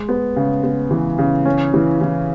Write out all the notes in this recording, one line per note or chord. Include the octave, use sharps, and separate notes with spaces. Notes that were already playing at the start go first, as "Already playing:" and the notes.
Already playing: G#3
B3
C#3
B3
E3
C#3
C#4
E3
E3